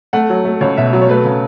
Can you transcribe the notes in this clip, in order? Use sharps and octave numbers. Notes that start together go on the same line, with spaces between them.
A3 F#5
F#3
A3
C#2 C#5
B2 E5
F#3
C#5
A3 B4
C#3